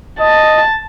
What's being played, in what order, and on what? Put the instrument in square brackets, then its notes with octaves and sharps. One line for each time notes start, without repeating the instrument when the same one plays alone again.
[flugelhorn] D#5 [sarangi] A5